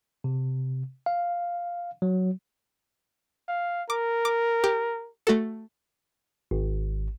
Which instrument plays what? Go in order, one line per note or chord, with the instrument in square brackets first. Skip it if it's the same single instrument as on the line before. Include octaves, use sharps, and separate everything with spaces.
[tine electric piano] C3
F5
F#3
[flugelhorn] F5
[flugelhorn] A#4 [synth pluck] D6
[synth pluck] D6
G4
A3 F#4 A4
[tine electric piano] G#1